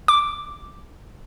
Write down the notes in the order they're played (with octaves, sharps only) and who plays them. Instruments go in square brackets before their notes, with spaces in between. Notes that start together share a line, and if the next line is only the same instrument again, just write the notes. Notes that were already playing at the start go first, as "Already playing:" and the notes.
[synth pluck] D6